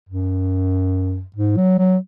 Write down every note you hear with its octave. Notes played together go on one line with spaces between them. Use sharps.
F#2
G#2
F#3
F#3